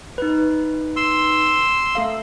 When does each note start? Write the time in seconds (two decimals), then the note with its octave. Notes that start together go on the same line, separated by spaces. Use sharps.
0.18 D#4 B4
0.96 C6 E6
1.95 A3 A4 F5